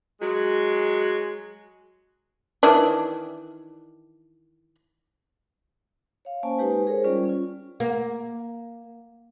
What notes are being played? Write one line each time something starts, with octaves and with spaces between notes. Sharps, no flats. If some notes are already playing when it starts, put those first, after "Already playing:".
F#3 G#3
D#3 E3 D4
C#5 F5
A#3 C#4 C5 G#5 A5
G#3 D#4 G4 B4 G#5
G#4 A#4 C5 C#5
G3 C#4 F4 D5
C#4 F4
A#3